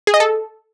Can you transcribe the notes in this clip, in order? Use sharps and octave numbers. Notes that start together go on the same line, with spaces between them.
G#4
D#5
A4